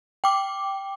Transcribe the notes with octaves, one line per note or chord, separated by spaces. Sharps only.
G5 D6